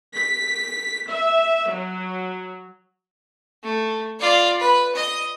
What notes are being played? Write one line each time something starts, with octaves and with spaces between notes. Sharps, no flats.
B6
E5
F#3
A3
F4 D5
B4
D#5